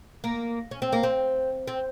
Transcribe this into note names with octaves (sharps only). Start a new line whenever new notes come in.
A#3
C#4
C4
A#3
C4
C4